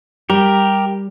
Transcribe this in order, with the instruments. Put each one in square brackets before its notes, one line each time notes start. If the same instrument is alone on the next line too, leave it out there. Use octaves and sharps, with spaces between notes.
[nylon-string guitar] G3 [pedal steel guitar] G4 A#4